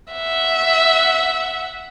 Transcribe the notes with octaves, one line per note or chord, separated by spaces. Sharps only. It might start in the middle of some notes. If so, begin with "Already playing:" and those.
E5 F#5